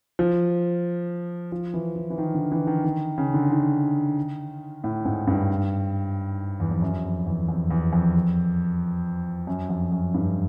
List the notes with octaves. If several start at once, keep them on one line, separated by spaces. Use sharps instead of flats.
F3
F3
E3
E3
E3
D#3
D3
E3
D#3
D#3
C#3
D3
D#3
A2
G#2
G2
E2
F2
F#2
F2
E2
F2
E2
F2
F#2
F2
F#2
G2